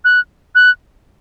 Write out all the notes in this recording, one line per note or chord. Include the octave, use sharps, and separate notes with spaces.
F#6
F#6